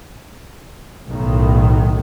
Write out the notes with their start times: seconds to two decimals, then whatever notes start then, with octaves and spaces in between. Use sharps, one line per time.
1.08 B1 A2 D#3